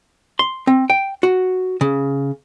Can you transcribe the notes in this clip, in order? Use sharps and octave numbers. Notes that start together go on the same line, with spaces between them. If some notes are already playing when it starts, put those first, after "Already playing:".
C6
C4
G5
F#4
C#3